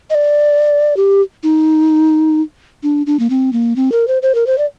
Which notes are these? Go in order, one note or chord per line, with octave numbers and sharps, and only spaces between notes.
D#5
D5
G4
D#4
D4
D4
A#3
C4
A#3
C4
A#4
C5
C5
A#4
C5
D5